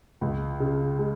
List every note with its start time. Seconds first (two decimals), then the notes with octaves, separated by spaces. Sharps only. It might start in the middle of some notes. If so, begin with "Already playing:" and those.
0.21 C#2
0.60 C#3
0.99 G#3